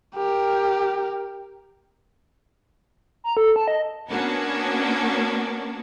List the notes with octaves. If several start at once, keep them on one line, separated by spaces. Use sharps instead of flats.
G4 A#4
A#5
A4
A5
D#5
A#3 B3 C#4 D4 F#4